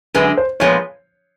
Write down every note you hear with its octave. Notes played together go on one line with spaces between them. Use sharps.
F#2 D3 G#3 B4
C5
A#2 F3 G#3 B3 C#5